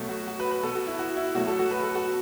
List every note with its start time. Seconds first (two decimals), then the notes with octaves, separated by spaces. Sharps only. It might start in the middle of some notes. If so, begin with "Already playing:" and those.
Already playing: B2 F#3 A3
0.09 F#4
0.27 F#4
0.40 B4
0.51 B4
0.63 B2 B3 A4
0.75 F#4
0.87 E4
0.99 F#4
1.17 E4
1.34 B2 F#3 A3 F#4
1.47 A4
1.59 F#4
1.71 B4
1.83 A4
1.95 F#4